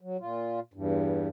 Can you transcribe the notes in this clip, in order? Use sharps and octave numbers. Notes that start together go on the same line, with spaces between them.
F#3
A#2 F4
E2 G2